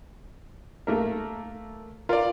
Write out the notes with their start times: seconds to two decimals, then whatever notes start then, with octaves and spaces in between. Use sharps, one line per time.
0.87 A3 A#3 A#4
2.09 F4 A#4 D5